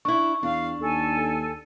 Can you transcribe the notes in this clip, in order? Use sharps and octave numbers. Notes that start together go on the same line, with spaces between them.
D4 E4 C#6
E2 D4 F5
D#2 A4 G#5